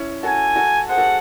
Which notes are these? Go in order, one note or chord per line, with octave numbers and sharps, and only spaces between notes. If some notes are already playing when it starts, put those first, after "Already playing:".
Already playing: C#4 E4
F#4 A4 G#5
F#4 A4
G#4 C5 F#5
F#4 A4
G#4